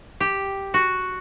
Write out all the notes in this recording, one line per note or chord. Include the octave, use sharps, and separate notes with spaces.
G4
F#4